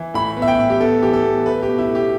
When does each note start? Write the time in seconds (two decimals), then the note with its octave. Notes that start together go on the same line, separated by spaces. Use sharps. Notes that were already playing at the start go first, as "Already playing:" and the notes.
Already playing: E3
0.14 A2 B5
0.37 B3
0.42 E5
0.48 G5
0.59 A2
0.70 G4
0.81 B3 A4
1.02 E3 G4
1.13 A4
1.24 B3
1.46 A3 B4
1.62 G4
1.68 B2
1.78 E4
1.89 A3
1.95 G4